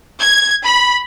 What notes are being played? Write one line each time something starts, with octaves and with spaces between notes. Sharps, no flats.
G#6
B5